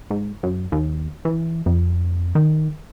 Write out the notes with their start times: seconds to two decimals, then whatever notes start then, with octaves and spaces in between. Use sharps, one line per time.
0.11 G#2
0.43 F#2
0.72 D#2
1.25 E3
1.66 F2
2.35 D#3